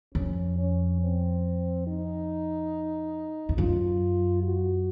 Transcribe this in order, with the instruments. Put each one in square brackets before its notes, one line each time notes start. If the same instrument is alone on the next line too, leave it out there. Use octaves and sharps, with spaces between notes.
[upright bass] F2 [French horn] C#4
[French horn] C#4
C4
D#4
[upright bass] F2
[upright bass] F#2 [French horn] F4
[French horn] F#4